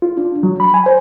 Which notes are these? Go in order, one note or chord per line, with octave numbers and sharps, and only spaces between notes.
F4
D4
F#3
B5
G#5
C5